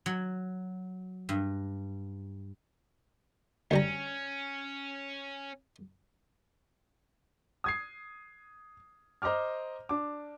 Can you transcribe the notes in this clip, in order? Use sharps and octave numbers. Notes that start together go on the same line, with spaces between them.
F#3
G2
D2 G3 C#4 A#5
D#6 G#6 C7
C5 D#5 A#5 D6 F6
D4 D6